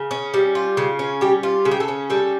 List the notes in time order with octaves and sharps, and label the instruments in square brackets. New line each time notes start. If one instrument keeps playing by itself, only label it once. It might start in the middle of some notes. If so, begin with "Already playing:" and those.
Already playing: [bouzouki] C#3
C#4
G3
F4
C#3
C#4
G3 G4
F4
C#3
G4
A4
C#4
G3 A4